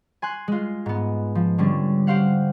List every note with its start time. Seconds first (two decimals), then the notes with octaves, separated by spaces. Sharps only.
0.22 G#5 C6 F#6
0.48 G#3 F4
0.86 G#2 B3
1.35 F3
1.58 D3 G3 C#4 D4
2.07 G4 C5 F5 F#5